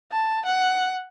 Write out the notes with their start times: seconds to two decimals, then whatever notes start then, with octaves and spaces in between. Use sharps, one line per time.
0.12 A5
0.46 F#5